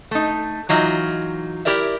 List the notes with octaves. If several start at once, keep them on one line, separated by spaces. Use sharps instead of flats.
A3 D#4
E3 F#3 D#4 F4
E4 G4 A#4 D5 E5